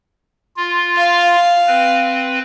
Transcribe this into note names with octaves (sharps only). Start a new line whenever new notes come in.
F4
F5
C4 B4